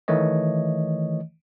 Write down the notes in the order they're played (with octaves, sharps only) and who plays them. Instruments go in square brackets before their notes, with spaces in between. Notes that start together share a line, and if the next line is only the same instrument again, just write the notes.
[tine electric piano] D#3 E3 A3 C#5 D#5